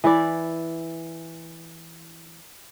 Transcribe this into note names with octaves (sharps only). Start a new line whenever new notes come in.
E3 E4 D5